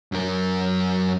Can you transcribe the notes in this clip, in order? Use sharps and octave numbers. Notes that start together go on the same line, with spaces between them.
F#2 A#4